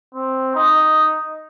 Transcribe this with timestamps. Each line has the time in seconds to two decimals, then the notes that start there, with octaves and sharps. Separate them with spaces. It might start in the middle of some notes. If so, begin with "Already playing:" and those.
0.15 C4
0.55 D#4